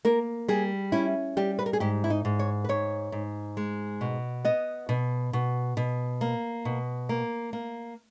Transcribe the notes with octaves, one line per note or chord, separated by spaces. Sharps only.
A#3 A#4
G3 G#4
C#4 E4
G3 G4
B4
A#4
G#4
G#2 G4
E4
D#4
G#2
C#5
B4
G#2 C#5
G#2
G#3
B2
B3 D#5
B2
B2
B2
A#3
B2
A#3
A#3